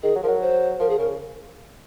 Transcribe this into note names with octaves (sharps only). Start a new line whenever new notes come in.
D#3 G#4
F#3
F3 A#4
F#3
C5
F3 A#4
G#4
C#3 A#4